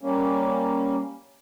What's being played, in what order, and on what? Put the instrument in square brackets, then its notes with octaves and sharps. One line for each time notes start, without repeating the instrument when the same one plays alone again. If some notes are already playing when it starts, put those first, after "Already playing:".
[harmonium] G3 A#3 C#4